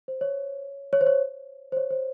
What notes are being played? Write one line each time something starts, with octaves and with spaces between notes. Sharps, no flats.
C5
C#5
C#5
C5
C#5
C5
C#5
C5